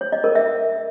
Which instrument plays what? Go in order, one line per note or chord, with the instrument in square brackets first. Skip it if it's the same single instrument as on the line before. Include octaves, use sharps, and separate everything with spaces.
[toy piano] C#5
D#5
A#4
E5